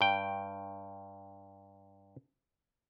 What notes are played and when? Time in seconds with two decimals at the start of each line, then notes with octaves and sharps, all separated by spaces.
0.01 G2 G5